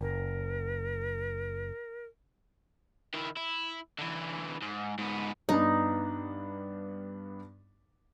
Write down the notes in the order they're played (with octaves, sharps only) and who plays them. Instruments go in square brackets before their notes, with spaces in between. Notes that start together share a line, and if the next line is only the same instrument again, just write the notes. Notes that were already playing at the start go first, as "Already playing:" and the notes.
[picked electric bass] F#1 [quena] A#4
[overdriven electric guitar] D#3 E4
E4
D3 E3
G#2
G#2 B3
[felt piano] G2 B3 D4 [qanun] D#4